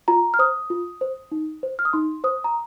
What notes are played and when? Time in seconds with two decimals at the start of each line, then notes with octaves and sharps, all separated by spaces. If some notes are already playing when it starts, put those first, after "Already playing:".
0.08 F4 A#5
0.34 F6
0.39 C5 D#6
0.70 F4
1.01 C5
1.32 D#4
1.63 C5
1.79 F6
1.85 D#6
1.93 D#4 C6
2.24 C5 D#6
2.44 A#5